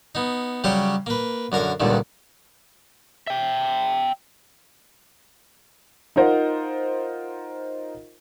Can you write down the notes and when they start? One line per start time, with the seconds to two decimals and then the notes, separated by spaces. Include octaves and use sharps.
0.15 B3 D#4
0.64 C#3 F#3 G3 G4 C6 D6
1.06 A#3 B4
1.52 F#2 D3 A#4 F5
1.80 C#2 G2 A#2 D3 D#3
3.27 E5 G5
6.16 D#4 F4 A#4 C5 D#5 F#5